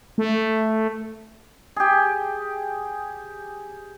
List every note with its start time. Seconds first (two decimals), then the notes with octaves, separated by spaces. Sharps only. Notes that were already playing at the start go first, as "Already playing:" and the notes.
0.18 A3
1.76 G4 G#4